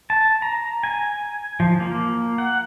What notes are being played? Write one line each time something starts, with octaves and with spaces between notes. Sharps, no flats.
A5
A#5
G#5
F3
A#3
F#5